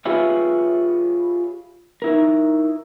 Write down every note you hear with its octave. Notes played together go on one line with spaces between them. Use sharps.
F4 G4 G#4 B4 C#5 E5
D#4 E4 A#4